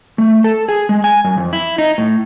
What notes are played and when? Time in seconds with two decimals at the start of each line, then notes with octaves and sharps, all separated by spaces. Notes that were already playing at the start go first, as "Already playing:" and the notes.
0.18 A3
0.44 A4
0.69 G#4
0.89 G#3
1.04 G#5
1.25 F#2
1.37 F2
1.53 E4
1.78 D#4
1.98 A2